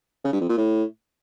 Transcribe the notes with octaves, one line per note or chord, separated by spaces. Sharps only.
C#3
G2
F2
A#2
A2